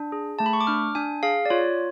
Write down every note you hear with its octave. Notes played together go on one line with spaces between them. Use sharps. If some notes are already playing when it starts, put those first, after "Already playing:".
Already playing: D4
G#4
A3 A5
B5
C#6
D6
D4 F6
D4 G#5
G#4 F5
D5
F4 C#5